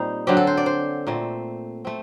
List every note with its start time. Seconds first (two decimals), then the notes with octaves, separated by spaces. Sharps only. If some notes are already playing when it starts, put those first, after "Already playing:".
Already playing: A#2 G3 C4 D#4 C5
0.27 D3 F#3 C4 G4
0.37 A4
0.47 C5
0.57 D5
0.66 C5
1.07 A#2 A3 C4
1.85 A3 C4